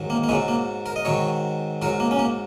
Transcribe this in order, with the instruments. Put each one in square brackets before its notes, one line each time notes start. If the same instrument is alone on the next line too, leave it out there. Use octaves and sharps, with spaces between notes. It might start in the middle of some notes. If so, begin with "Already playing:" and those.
Already playing: [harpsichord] G#2 D#3 F#3
A#3
A#3
G#2 F#3 G#3
A#3
A#4
D#5
G#2 D#3 F#3 C#5
G#2 F#3 A#4
A#3
C#4
A#3